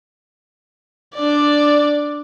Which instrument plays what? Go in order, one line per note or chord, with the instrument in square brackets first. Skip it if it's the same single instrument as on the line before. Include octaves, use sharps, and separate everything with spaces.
[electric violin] D4 D5